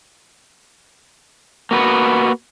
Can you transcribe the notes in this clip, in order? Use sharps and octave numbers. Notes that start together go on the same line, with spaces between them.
A#3 F#4 B4